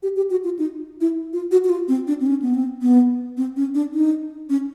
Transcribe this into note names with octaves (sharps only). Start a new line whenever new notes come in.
G4
G4
F#4
F4
D#4
E4
F4
F#4
F#4
F4
C4
D4
C4
C#4
B3
C4
B3
C4
C#4
D4
D#4
C#4